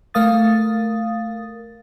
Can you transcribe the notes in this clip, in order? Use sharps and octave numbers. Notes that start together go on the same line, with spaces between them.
A3 A#4 F5 D#6 A6